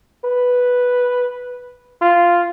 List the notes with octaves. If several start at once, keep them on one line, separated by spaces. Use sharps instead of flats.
B4
F4